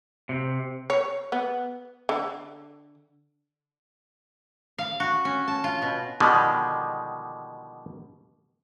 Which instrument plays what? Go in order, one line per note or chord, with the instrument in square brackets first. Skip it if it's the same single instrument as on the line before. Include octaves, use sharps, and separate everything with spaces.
[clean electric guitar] C3
[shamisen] C#5
B3
D3
[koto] F5
F#4
C#4
A5
F4
B2
[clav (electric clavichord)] B2 D3 D#3 F3 G3 G#3